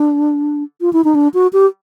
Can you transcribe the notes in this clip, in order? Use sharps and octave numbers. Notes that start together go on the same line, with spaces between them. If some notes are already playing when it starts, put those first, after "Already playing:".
Already playing: D4
F4
E4
D#4
D4
F#4
G4